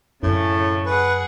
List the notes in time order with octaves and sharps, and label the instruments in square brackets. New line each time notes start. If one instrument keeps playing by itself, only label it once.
[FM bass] F#2 [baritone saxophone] A2 [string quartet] C#3 A3
[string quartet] G#4 F#5 [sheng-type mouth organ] B4